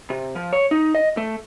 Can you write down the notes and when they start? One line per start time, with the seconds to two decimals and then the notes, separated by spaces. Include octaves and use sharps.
0.10 C3
0.35 F3
0.53 C#5
0.71 D#4
0.95 D#5
1.17 A3